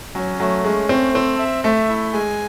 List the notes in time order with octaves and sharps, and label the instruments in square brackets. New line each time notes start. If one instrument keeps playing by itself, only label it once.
[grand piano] F#3 [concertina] C#4
[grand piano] F#3 [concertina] A3
[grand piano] G#3 [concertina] C#4
[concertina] A3 [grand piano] C4
[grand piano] C4 [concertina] A4
[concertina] E5
[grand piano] A3 [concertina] E5
[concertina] E4
[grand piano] G#3 [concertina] G#5